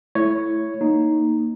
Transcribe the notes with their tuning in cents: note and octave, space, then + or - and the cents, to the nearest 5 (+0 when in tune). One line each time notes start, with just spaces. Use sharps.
A3 +0 E4 +0 C#5 +0
A#3 +0 D#4 +0